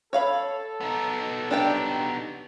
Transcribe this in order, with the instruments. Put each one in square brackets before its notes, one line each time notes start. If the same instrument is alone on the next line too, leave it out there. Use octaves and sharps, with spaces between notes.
[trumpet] A4 [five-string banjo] C#5 F5 B5
[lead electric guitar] B3 D#4
[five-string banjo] D4 G4 G5